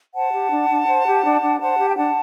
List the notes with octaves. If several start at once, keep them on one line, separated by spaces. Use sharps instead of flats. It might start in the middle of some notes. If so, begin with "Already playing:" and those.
C5 F#5 A5
G4
D4
D4
C5
G4
D4
D4
C5 F#5 A5
G4
G5
D4 F#5 A5